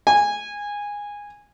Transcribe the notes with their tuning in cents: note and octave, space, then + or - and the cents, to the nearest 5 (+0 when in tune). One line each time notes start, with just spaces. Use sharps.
G#5 -15